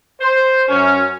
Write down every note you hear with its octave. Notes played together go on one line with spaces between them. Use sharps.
C5
F#2 C#4